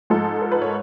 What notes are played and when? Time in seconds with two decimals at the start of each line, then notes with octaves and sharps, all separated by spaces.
0.10 G#2 F3 G#3 A4
0.42 A#4
0.52 B4
0.62 C#5